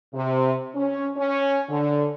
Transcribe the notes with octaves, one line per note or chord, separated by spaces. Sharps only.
C3
C#4
C#4
D3